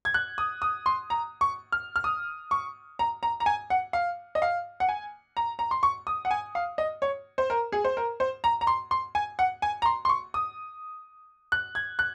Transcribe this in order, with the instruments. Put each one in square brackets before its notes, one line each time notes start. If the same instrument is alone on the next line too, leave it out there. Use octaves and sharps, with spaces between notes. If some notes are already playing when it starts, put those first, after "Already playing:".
[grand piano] G#6
F#6
D#6
D#6
C6
A#5
C#6
F6
F6
D#6
C#6
A#5
A#5
A#5
G#5
F#5
F5
D#5
F5
F#5
G#5
A#5
A#5
C6
C#6
D#6
F#5
G#5
F5
D#5
C#5
C5
A#4
G#4
C5
A#4
C5
A#5
A#5
C6
C6
G#5
F#5
G#5
A#5
C6
C6
C#6
D#6
F#6
G#6
F#6